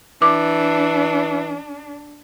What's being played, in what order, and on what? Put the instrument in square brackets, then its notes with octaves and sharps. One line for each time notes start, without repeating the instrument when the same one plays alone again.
[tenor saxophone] E3 [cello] D4 [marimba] D6